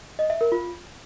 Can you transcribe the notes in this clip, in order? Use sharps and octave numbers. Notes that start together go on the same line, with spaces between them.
D#5
E5
A#4
F4